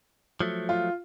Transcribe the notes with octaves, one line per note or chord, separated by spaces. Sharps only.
F3 F#3 A3
F4